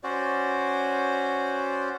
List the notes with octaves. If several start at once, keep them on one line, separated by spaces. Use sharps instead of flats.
C#4 F#4 C5 D5